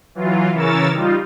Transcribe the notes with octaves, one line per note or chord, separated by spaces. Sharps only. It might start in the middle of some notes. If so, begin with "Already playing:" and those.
E3 F#3 F4
C#3 E3 A#4 C#5 E6 A6
G3 D#4 F4